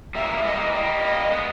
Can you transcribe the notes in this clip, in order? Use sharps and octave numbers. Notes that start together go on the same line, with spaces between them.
G3 A#3 E5
E3 G#3
G3 A#3
G#3 B3 D#5
G3 A#3
E3 G#3
G3 A#3 D#5
D#5
G#3 B3